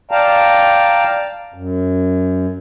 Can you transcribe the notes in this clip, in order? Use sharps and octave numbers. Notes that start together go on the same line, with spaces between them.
D5 F5 G5 A5 A#5
F#2